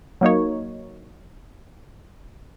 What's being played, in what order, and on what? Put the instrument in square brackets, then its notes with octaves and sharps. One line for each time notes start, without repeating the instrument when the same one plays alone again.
[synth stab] F#3 A#3 D#4 C#5